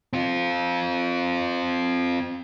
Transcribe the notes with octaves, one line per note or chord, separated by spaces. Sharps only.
C4 F4